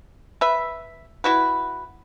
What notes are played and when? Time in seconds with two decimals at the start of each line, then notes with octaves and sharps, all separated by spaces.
0.41 B4 E5
1.24 E4 F#4 B4